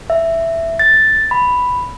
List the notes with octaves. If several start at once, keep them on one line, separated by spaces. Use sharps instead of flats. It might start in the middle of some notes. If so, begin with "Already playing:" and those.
E5
A6
B5